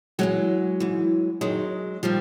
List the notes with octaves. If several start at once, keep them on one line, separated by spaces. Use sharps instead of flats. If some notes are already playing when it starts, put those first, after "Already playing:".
E2 C3 E3 F#3 G#3
G#2 E3
F#2 D#3 F#3 G#3
D#3 F3 G3